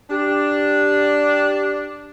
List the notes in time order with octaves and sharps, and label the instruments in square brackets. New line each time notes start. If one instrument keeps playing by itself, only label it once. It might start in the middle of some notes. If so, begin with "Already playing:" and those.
[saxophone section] D4 [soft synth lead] G4